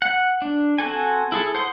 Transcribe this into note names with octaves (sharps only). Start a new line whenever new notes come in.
F#5
D4
C4 F#4 A4 G#5
E4 G#4 A4
C5 F#5 C6 D6 D#6